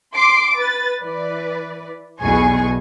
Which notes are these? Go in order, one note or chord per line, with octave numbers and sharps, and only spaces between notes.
C6 D6 C7
B4 A6
E3 B4 D5
B1 E2 B2 G#4 G#5 C#6